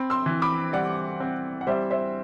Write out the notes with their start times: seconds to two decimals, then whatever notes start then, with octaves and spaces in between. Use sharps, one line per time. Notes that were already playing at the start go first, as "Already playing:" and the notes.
Already playing: C4 B5
0.10 C6 E6
0.26 E3
0.42 B5 D6
0.73 G3 D5 F#5
1.20 C4
1.61 F#5
1.67 G3 C5 E5
1.90 C5 E5